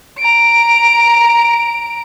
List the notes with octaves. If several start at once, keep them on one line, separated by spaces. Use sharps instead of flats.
A#5 D7